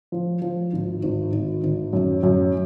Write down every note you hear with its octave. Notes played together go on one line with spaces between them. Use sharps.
F3
F3
G#1
G#1
G#1
G#1
F#2
F#2